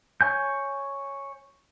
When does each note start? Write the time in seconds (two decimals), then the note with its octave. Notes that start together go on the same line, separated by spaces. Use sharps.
0.21 C#5 G#5 G6